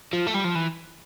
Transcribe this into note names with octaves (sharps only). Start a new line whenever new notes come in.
F3
A3
G3
F3
E3